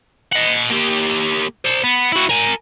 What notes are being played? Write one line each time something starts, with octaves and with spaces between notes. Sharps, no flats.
D#5 F#5
A#3 G4
C5 D5
B3
E4 F#4
A#4 G#5